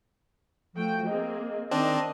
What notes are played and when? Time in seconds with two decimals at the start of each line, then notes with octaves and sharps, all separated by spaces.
0.75 F3 A3 F#4 G5
1.06 A#3 C4 G#4 D#5
1.71 D#3 C4 D4 D#5 A5